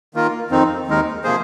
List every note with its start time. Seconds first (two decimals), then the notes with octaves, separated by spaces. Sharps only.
0.15 D#3 A#3 F4 A#4
0.50 F2 D#3 C4 D#4
0.87 D#2 D#3 G#3 D#4 A#4
1.24 C3 F3 A#3 G#4 C5